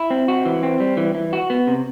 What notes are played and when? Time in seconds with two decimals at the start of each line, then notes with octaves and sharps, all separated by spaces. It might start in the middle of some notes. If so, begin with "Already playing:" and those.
Already playing: E4
0.10 C4
0.28 F#4
0.45 E3
0.63 C4
0.80 G3
0.97 E3
1.15 E3
1.33 F#4
1.50 B3
1.67 C3